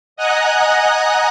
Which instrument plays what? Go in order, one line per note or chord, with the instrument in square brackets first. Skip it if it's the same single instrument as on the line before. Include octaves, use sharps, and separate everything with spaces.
[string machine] D#5 F#5 G#5 A#5 D#6 F#6